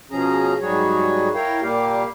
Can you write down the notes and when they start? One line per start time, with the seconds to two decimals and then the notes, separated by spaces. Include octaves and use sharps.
0.11 B2 F3 C#4 G#4 A#5
0.62 G#2 F#3 G3 F#4 G#4 C#5
1.34 E4 A#4 C#5 F5 G5
1.62 A#2 G3 A#3 G4 F5